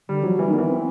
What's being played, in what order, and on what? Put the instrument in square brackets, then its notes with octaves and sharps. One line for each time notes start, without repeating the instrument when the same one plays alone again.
[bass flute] D3 [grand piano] G3
[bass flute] F3 [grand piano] F#3
[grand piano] E3 [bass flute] G3
[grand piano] D#3
[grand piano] E3 [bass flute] B3
[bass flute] C4